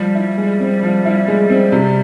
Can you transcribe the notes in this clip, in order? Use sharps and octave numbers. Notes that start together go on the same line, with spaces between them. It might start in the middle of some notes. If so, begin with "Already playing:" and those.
Already playing: F3 G3
E4
G#3
C4
F3
E4
G#3
C4
C3